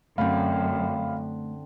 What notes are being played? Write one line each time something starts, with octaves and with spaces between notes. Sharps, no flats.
F#2 D3 A3 C4 F5 B5